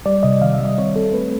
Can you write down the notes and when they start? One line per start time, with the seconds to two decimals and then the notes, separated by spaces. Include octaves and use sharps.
0.06 G3 D5
0.23 C3 D#5
0.41 D#3 F5
0.53 E5
0.59 G3
0.65 D#5
0.78 C4 C#5
0.96 C4 A4
1.13 A3 B4